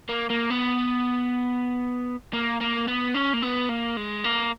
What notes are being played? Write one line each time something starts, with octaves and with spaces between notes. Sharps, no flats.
A#3
A#3
B3
A#3
A#3
B3
C#4
A#3
B3
A#3
G#3
A#3